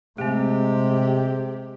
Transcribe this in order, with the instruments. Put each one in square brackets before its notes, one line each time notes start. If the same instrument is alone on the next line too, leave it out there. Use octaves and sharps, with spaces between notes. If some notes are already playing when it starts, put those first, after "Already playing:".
[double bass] C3 [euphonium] G#3 [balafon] A3 C4 [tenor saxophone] G4